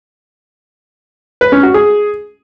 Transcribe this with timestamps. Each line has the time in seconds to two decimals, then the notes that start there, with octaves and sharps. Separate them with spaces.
1.41 B4
1.52 C#4
1.63 F#4
1.74 G#4